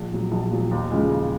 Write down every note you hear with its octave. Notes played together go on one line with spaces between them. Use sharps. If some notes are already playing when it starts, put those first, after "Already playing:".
Already playing: A#1
A#2 F#3
A#1
A#2 F#3
D#2
C#3 F3 G#3
D#2